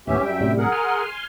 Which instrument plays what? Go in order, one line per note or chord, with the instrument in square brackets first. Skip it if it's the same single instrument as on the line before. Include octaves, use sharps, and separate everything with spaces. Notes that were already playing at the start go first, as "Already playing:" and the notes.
[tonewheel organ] D#2 A2 B3 [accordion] C#4 G4 E5
[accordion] F#2 E5 G5 [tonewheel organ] G3
[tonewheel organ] A2 C3 G3
[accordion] G#4 A#4 F#5
[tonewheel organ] G#5 C6 F6